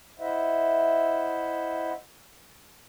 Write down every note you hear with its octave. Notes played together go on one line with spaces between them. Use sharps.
E4 C5 D#5 E5 F#5